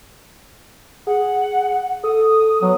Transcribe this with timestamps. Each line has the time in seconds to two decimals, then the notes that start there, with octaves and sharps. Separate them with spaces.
1.07 G#4 F#5
2.04 A4 D#6
2.62 F#3 B3